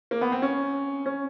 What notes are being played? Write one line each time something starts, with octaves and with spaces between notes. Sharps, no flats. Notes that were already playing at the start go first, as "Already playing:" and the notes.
A#3
B3
C4
C#4
C#4